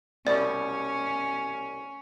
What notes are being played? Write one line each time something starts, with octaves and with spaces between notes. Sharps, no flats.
C2 B2 G3 C#4 D5